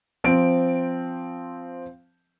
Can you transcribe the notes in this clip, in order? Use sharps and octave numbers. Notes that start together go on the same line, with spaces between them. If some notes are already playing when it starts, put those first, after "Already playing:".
F3 C4 D7